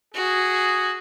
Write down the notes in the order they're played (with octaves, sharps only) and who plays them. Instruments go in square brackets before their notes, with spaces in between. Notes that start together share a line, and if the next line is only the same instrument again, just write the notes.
[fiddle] F#4 [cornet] G#4